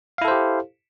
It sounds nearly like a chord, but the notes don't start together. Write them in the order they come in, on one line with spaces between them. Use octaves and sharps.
F5 E4 A4 C5 G4